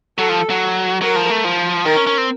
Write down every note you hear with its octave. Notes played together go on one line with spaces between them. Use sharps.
F#3 A4
F3
F#3
F#3 A#4
F3
A3
F3
D#3 A#4
C#4
C#4
C4